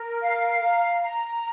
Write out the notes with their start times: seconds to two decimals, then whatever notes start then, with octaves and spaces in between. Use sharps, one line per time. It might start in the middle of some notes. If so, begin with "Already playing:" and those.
Already playing: A#4
0.22 F5
0.62 A#5
1.02 A#5